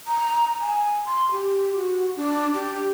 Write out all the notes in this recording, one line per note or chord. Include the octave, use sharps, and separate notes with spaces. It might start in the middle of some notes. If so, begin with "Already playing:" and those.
A#5
G#5
C6
G4
F#4
D4
G4